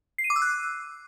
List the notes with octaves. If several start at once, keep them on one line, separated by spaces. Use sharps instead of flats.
C7
D#7
D6
E6
F#6